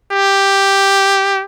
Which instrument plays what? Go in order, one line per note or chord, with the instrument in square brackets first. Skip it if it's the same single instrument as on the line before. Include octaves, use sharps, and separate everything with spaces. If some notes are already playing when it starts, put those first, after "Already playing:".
[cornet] G4